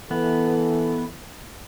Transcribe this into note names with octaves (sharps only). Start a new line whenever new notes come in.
E3 B3 A4